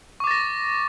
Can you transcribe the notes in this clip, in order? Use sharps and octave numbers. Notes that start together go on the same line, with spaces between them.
C#6 D6 A6 A#6